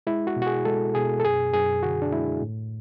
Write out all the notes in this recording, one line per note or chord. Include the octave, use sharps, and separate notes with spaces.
G#3 E4
F#4
B2
F#4
G#4
G#3 A4
B2 G#4
A4
F#2 G#4
F#2 G#4
D3 F#4
D4
G#3 E4
A2